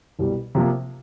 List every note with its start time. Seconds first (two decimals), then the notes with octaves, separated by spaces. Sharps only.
0.19 C2 B2 G3
0.55 C3 F3 A#3